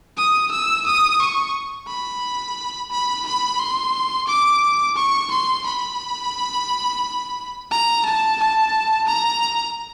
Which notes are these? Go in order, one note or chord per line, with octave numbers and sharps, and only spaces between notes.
D#6
E6
D#6
C#6
B5
B5
B5
C6
D6
C#6
C6
B5
A#5
A5
A5
A#5